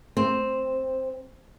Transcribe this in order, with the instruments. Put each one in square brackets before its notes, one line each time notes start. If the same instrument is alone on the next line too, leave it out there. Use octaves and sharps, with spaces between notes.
[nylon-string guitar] C4